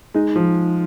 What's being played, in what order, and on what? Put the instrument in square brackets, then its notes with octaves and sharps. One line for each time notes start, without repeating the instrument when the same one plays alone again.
[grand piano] G#3 [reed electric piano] D#4
[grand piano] F3